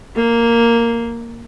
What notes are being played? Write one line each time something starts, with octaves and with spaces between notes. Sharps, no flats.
A#3